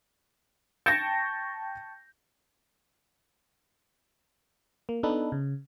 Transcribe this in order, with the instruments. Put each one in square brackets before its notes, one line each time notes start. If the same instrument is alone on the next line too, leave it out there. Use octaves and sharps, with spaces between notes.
[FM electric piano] G5 A5 C#6 [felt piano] G6 A#6
[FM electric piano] A#3
B3 D4 D#4 A4 B4
C#3